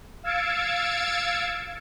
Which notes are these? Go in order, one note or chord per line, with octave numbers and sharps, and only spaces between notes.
F5 E6 G#6 A6 C#7 D7